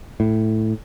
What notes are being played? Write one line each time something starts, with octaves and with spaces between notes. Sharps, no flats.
A2